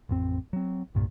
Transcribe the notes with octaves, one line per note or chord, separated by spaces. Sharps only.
A1 F2 C4
F#3 C4
C2 G2 A#2